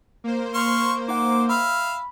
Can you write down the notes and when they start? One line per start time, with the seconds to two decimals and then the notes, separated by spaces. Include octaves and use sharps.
0.24 A#3 C5
0.54 C6 C#6 F6
1.08 D#4 F#5 D6
1.49 E5 F5 B5